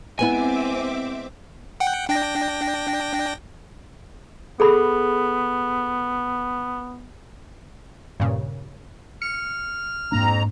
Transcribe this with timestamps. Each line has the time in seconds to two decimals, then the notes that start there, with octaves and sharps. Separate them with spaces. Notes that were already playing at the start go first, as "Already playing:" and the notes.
0.19 G#3 B3 C4 E4 E5 G#5 D6
1.80 F#5 G5
2.09 D4 G5 A#6
4.60 B3 G#4 A4 B5
8.20 G2 A#2 C#3
9.22 F6 C#7
10.12 F2 G#2 A#3 D4 A#5